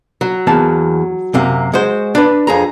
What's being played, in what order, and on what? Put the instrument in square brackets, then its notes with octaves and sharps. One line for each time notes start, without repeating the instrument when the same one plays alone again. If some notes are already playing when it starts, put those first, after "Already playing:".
[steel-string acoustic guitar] F#3
[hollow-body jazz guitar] E2 A#3 A5
F#2 C3 A#3
G#3 F#4 C5
[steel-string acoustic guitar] D4 [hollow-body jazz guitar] B4 D5
[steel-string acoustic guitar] F2 G#4 A#5